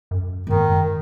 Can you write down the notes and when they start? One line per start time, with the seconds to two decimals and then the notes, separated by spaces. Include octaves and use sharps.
0.11 F#2
0.47 G#2 D#3 A#3